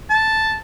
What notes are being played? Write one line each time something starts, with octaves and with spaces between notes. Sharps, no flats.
A5